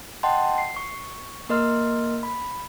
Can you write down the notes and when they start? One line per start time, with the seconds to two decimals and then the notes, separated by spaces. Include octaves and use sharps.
0.23 D#5 F#5 G5 A5 C6
0.58 C7
0.76 C#6
1.49 A#3 A#4 D#5 C6 F6
2.23 B5